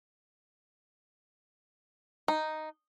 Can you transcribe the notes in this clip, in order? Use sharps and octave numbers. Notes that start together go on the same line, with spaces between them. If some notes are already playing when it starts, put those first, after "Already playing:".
D#4